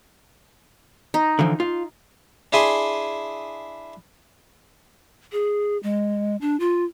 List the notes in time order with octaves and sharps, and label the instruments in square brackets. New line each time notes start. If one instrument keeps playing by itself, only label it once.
[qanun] D#4
[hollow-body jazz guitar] D3 E3 F3
F4
[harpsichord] D4 E4 G#4 E5 G#5 C6
[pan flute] G#4
G#3
D4
F4